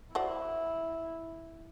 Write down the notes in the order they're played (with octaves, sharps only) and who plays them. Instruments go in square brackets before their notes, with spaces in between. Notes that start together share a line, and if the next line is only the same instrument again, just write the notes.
[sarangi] E4 [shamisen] F#4 C5 D5